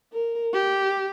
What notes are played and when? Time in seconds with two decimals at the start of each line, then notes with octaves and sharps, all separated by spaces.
0.12 A#4
0.53 G4